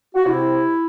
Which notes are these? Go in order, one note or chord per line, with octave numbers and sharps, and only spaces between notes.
F#4
C3 E4